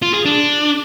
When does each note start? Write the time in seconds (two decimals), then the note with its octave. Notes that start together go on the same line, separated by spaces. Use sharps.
0.02 F4
0.14 G#4
0.25 D4